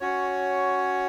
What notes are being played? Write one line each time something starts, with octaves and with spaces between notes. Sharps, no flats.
C#4 F#4 C#5